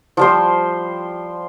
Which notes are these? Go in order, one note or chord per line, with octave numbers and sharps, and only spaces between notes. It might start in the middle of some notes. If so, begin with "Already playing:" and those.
F3 G3 C5